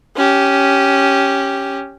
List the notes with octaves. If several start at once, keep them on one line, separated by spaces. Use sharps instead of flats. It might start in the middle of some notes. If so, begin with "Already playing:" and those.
C#4 G4